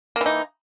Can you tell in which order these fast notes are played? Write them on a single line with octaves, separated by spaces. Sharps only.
A#3 E3 D#4